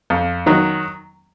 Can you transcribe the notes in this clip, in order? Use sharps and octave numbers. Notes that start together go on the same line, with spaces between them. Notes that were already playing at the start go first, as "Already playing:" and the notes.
F2
D#3 F#3